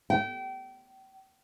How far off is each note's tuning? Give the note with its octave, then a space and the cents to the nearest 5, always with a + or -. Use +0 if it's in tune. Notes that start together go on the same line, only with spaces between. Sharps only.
G5 -30